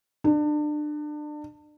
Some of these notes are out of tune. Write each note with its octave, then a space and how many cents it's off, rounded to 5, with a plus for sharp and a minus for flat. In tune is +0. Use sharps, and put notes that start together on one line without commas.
D4 +30